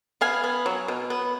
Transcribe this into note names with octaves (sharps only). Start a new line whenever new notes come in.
B3 F5 G#5
B3
F#3
B2
B3